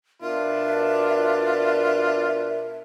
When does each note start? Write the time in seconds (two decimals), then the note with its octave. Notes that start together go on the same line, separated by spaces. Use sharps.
0.22 B2 D4 F4 A#4 E5